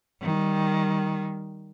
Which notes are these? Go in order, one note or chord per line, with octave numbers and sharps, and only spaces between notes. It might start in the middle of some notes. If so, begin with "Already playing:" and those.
D#3 G3